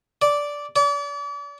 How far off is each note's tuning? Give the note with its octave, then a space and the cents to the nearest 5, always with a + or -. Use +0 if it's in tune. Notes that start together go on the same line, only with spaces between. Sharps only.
D5 -10
D5 -40